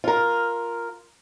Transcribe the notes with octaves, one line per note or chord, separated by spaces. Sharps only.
F4 A#4